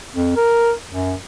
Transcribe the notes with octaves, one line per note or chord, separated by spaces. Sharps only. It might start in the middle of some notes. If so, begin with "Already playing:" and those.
F2
A#4
F#2